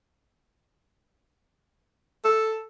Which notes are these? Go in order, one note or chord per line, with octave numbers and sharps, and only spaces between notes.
A4